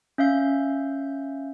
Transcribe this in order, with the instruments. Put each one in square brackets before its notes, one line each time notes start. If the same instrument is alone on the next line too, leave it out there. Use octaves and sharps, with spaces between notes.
[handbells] C#4 E5 F5 G6